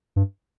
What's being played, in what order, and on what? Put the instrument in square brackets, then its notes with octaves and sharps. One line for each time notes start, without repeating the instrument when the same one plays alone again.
[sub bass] G2